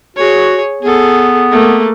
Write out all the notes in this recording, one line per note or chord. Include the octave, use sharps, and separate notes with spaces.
F#4 G#4 C#5
B3 G#4 A4
A3 A#3